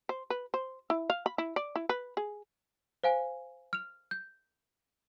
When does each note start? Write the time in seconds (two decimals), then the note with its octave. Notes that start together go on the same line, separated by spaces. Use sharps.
0.09 C5
0.30 B4
0.54 C5
0.90 E4
1.10 F5
1.26 B5
1.38 E4
1.56 D5
1.76 E4
1.89 B4
2.17 G#4
3.03 C5 F5 G#5
3.73 F6 F7
4.11 G6